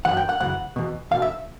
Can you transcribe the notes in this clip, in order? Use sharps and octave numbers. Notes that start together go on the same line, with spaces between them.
F#2 C#3 E3 F#5
G5
F#5
F#2 C#3 E3 F#5
E2 B2
E2 B2 F5
E5